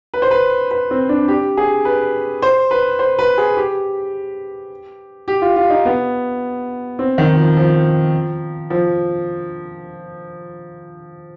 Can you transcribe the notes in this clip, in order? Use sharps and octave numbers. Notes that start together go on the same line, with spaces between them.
B4
C5
B4
B4
C4
D4
G4
G#4
B4
C5
B4
C5
B4
G#4
G4
G4
F4
F4
D#4
B3
C4
D#3
F3
F3
F3